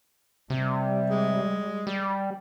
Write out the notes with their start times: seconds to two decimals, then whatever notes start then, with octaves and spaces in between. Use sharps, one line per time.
0.50 C3 G3
1.10 G#3
1.87 G3